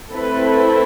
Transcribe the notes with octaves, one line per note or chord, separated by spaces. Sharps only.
A3 C4 E4 A4 B4